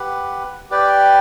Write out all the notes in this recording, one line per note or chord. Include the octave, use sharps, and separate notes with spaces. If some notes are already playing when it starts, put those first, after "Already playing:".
Already playing: G4 B4 F#5
G4 B4 D5 G5